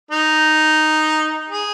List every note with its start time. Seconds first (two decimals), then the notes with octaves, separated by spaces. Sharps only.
0.11 D#4
1.49 G#4